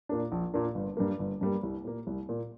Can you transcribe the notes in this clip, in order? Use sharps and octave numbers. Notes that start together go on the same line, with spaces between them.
A#2 A#3 D4
A#1
A#2 A#3 D4
G1
G2 G3 A#3
G1
G2 G3 A#3
C2
A#2 A#3
C2
A#2 A#3